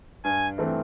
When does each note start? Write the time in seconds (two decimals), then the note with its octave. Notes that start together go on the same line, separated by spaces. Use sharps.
0.24 G2 G#5
0.58 E3 A3 C4